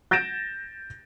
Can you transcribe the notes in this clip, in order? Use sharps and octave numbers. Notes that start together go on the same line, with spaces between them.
G6 A6 A#6 D7 E7